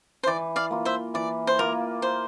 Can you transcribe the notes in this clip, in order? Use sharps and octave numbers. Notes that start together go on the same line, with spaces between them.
C5
E3 D5
D5 F5
A#3 F4
C5 E5
E3 D5
C5
A#3 F4 A#4
C5